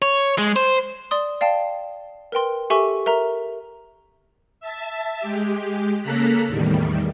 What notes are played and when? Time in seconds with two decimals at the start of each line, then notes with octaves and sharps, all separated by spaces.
0.02 C#5
0.38 G#3
0.56 C5
1.11 D5 C6 D#6
1.41 D5 F5 G5 A5
2.32 A#4 B4 G5 C6
2.70 G4 A4 E5 G#5 C#6
3.06 A#4 E5 A#5
4.60 E5 A5
5.20 G#3 G4
6.02 C#3 A#3 A4 A#5 F#6 B6
6.48 E2 A2 D#3 G3